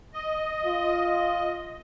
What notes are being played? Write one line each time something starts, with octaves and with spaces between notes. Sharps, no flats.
D#5
F4